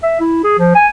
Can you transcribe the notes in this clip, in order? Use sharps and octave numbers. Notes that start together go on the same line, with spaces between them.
E5
E4
G#4
F3
G#5